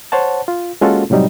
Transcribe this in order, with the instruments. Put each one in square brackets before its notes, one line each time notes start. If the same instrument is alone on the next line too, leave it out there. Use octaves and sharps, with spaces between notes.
[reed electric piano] C5 C#5 F#5 A5
F4
G#3 A#3 C#4 F4 F#4 A4
A2 C3 F#3 G3 D#4